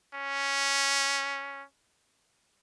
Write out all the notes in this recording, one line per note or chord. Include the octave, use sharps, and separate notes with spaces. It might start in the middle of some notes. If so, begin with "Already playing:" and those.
C#4